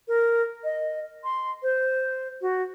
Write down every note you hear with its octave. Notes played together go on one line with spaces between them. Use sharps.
A#4
D#5
C6
C5
F#4